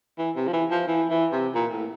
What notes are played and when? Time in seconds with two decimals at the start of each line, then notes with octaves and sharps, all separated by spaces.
0.19 E3
0.36 C3
0.48 F3
0.53 E3
0.71 F3
0.87 E3
1.10 E3
1.32 C3
1.55 A#2
1.72 A2